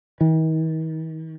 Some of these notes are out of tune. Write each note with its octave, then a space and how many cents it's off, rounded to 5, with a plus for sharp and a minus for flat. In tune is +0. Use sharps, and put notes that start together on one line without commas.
D#3 +45